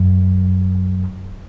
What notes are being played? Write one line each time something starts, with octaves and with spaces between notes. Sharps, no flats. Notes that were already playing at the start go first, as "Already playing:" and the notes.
Already playing: F#2